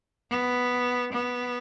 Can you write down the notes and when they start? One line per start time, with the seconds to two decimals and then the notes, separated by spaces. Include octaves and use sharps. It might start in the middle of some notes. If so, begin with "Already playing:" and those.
0.31 B3
1.13 B3